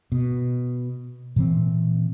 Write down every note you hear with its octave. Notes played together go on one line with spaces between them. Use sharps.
B2
A#2 E3 C4